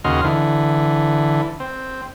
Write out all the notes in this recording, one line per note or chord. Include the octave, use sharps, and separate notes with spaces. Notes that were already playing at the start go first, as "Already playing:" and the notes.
D#2 C#3 F#4 D#5 C6 F6
D3 E3
C4